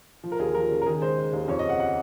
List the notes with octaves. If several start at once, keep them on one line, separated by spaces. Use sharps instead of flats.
F3
A#4
D#2 G#4
F3 A#4
C#3
A#4
D#3 G#4
G#3 C5
G#3
D#2
F2 C#5
D#5
C#3
F#5
F#5